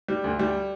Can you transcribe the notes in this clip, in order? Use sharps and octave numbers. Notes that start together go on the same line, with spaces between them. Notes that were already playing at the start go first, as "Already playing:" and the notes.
G3
D2
G3